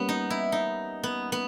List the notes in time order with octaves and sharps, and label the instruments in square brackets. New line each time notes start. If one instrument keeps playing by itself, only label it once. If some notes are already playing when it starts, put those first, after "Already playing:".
Already playing: [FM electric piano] G3 A#3 C#4 [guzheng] B3
[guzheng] D#4
E4
D#4
B3
B3